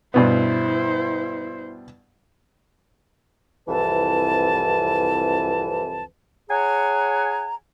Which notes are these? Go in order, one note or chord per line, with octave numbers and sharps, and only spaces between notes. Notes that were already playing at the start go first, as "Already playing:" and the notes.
G2 B2 B3 E4 C5
C2 F2 E3 B4 A5
G#4 C#5 F#5 G#5 A#5